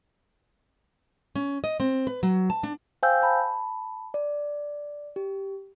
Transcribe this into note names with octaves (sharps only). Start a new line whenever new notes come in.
C#4
D#5
C4
B4
F#3
A5
D4
C5 F5 G5 G#5 E6 G6
A5 B5
D5
G4